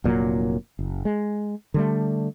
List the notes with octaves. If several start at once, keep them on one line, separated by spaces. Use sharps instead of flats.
F1 A#2 F#3 A#3
F#1
G#3
D3 G3 A3